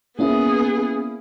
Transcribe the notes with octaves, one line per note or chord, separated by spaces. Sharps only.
A#3 B3 C#4 E4 G#4